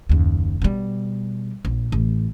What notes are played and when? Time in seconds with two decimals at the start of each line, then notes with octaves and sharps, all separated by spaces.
0.09 F#1 D#2
0.62 B2 G3
1.65 A#1
1.92 A1